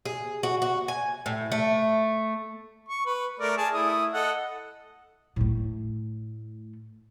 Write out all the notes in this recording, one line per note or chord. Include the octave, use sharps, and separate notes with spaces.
G#4
F#4
F#4
G#5
A2
A3
C#6
B4
A3 A#4 D5
G#4 A5
A3 E4 D#6
A4 D#5 F#5
A2 A3